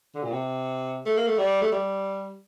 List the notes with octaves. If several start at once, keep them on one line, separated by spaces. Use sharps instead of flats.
D3
A#2
C3
A3
A#3
A3
G3
A3
G3